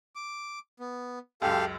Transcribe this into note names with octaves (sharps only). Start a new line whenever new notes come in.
D6
B3
C#2 F#2 G4 A4 F5